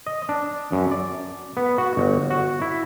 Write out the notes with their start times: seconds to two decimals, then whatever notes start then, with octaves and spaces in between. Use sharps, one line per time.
0.07 D#5
0.29 D4
0.72 F#2
0.91 D5
1.57 B3
1.78 F#4
1.97 G1
2.30 F#4
2.62 E4